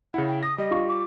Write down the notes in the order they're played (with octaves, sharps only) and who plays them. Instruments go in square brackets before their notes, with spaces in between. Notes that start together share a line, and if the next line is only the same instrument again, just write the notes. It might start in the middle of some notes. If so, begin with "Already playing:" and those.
[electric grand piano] C#3 E4 [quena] F#5
[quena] G5
[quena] D#6 [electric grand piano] A#6
[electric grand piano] G3 [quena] D#5
[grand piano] F4 C#6
[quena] D6